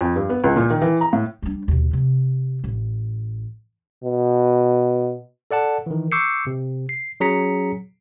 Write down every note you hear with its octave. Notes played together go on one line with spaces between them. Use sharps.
F2
G2
B3
C#2
A#2
D#3
E3
A#5
A2
G3 D4
D#2 B2
C3
A1
B2
A4 D5 F#5 A5
D#3 E3
C#6 D6 E6 G6 C7 C#7
C3
C7
F#3 C#4 G#4 A#5 B6 C#7